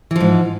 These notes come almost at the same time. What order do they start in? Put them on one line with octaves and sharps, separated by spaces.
E3 F3 G#2